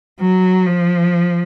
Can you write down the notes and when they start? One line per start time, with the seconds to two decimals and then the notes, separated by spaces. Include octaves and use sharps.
0.20 F#3
0.66 F3